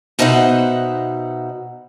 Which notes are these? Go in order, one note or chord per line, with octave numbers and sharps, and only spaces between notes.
B2 D#4 C5 E5 F#5